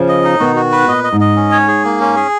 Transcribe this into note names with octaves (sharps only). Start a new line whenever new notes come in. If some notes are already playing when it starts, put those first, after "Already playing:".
Already playing: C#3 F3
D#5
D#4
B2 D#3 F#4
F#4
B4
A#2 D#5
D#5
G#2
D#5
C#4
C#5
G#4
A#3
C#4
G#4